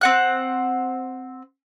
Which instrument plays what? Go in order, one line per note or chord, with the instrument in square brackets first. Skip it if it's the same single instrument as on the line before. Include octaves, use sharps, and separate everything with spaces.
[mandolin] C4 F#5 F#6